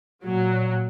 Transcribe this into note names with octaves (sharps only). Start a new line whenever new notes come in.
A#2 F#3